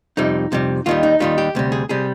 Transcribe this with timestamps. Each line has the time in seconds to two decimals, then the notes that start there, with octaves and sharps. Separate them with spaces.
0.17 F2 C3 G3 D#4
0.52 F2 C3 G3
0.86 D#2 D#3 G3 F4
1.03 D#4
1.20 D#2 D#3 G3 F4
1.38 G4
1.55 D2 C3 G3
1.72 G#4
1.89 C3 G3 G#4